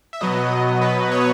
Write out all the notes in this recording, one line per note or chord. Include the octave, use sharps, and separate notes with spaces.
E5
B2 F#3 B3 D#5
B2 F#3 B3 B4
C#5